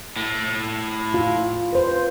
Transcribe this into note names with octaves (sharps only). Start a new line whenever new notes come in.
A2
F4
B4 C5